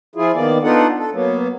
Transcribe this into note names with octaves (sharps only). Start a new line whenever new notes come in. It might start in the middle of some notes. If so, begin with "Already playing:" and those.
F3 E4 F4 G#4
D#3 A#3 B3 D5
B3 D4 D#4 F4 A4 F#5
A4
F#3 A#3 B3